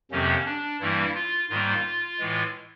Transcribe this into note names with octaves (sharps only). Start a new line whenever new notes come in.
F2 C3 D#3 F#3 A#3 C#4
D4
G2 E3 G3 A#3 E4
F4
G#2 D#3 G3 A#3 F4
A2 E3 G#3